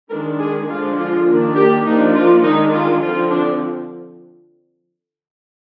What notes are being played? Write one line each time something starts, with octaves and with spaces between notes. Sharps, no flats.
D#3 G#3 D4 A#4
G#4
D3 F3 G#3 D4 F4
F4
D#3 A#3 D4
G4
F3 A#3 D4 D#4
F4
D#3 G#3 D4 D#4
F4
D3 F3 C4 F4
D4